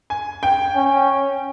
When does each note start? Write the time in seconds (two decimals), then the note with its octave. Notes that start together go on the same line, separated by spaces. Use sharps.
0.10 G#5
0.43 G5
0.75 C#4